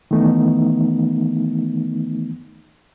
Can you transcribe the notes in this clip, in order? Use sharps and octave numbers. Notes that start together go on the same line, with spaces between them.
D#3 E3 A3 B3 D#4